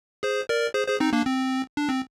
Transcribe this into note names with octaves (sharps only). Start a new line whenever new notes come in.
G#4 C5
A#4 D5
G#4 C5
G#4 C5
C4 D#4
A#3 D4
C4
D4
C4